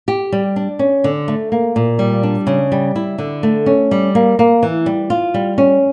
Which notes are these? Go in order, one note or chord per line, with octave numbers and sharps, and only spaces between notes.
G4
G3
D4
C#4
D3
A3
A#3
A#2
G3
D4
C#3
G3
E4
D3
A3
C#4
G3
A#3
A#3
E3
G3
F4
G3
C#4